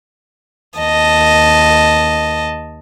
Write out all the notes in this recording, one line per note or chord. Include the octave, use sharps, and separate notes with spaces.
D#2 D#5 A5